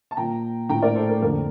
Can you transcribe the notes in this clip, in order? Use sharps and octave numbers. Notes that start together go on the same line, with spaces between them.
A5
A#2 F3 G5 A#5
A2 F3 G5 A#5
A#4 D5
A4 C5
A#4
F2 D3 F3 A#4